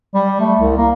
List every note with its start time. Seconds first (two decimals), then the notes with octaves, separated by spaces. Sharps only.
0.15 G3
0.40 A3
0.59 C2
0.77 A#3